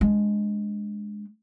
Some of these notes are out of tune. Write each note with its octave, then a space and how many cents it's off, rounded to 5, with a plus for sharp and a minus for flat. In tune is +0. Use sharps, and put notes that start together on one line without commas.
G#3 +0 D4 -10